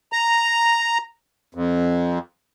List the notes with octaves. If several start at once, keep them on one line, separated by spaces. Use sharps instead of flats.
A#5
F2